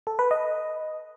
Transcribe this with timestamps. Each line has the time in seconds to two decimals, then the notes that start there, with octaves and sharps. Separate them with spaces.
0.07 A4
0.19 B4
0.31 D#5